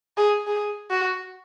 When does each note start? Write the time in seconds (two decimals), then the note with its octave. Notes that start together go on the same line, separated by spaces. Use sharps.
0.17 G#4
0.47 G#4
0.90 F#4